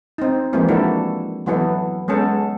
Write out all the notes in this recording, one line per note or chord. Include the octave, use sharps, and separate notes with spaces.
C4 D#4
E3 F3 G#3 A#3 C4
D4 E4 F#4 A4 A#4
E3 F#3 B3 E4 A4
G#3 B3 C#4 A4